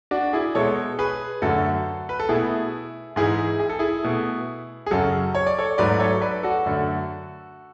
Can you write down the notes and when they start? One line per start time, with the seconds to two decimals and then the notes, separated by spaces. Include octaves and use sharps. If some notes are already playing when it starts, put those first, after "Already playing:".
0.11 D4 F#4
0.33 E4 G#4
0.55 B2 G#3 A4 C#5
0.99 G#4 B4
1.42 F#2 D3 A3 F#4 A4
2.09 B4
2.20 A4
2.29 B2 A3 E4 G#4
3.16 G#2 E3 G#3 E4 G#4
3.60 G#4
3.69 A4
3.79 E4 G#4
4.04 B2 A3
4.86 G#4
4.91 F#2 C#3 F#3 F#4 A4
5.35 C#5
5.46 D5
5.58 A4 C#5
5.78 G#2 F#3 A3 B4 D5
6.00 A4 C#5
6.21 B4 D5
6.43 F#4 A4
6.66 F#2 D3 A3